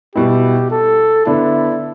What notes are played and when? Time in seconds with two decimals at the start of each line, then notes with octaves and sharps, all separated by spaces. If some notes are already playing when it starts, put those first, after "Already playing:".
0.15 B2 G3 E4 G4
0.71 A4
1.26 D3 B3 D4 E4